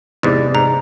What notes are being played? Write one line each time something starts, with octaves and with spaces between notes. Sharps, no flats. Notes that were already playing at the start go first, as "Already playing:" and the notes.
E2 G#2 C3 D5
G#2 A#5